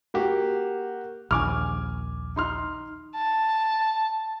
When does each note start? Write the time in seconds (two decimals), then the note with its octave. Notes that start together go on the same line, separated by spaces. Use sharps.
0.14 A#3 F#4 G4
1.31 A#1 D#2 G#5 D6 F6
2.36 D#4 C6 F6
3.16 A5